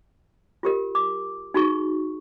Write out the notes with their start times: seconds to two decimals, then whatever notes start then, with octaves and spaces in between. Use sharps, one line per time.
0.63 F4 G4 A#4
0.95 D6
1.54 D#4 F#4 G#4 C#6